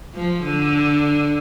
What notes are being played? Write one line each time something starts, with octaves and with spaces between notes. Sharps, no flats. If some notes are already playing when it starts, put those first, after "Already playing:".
F3
D3